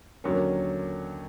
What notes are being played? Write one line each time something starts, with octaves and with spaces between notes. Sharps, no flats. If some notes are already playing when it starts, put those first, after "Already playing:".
D#2 D3 F#3 A#3 C#4